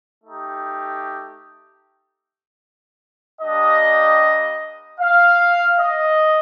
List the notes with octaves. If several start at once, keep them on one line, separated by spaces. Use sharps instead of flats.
A3 D#4 G4
G3 A#3 D4 G4 D#5
F5
D#5